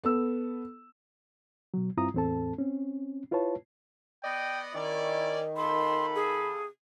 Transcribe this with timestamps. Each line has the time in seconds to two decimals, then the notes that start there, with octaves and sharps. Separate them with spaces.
0.04 B3 A4 E6
1.74 B2 F#3
1.97 G2 C4 E4 F4 A#5 D#6
2.14 E2 A2 C4 A4 A5
2.58 C4 C#4
3.31 E4 F4 B4 C#5 A5
4.24 B3 D5 D#5 G5
4.74 D#3 C#4 E4 D5
5.57 C3 F4 A4 B5 C6
6.15 G#4